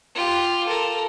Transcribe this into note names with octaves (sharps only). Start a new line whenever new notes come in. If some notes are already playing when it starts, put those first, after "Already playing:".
F4 G4
A4 A#4